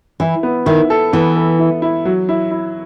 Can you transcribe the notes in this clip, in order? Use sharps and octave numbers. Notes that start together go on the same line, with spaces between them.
E3 E4
B3
D#3 E4
A4
E3 B3
A4
E4
E4
F#3
E4
E4